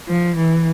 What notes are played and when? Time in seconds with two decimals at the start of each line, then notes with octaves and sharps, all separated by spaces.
0.09 F3
0.36 E3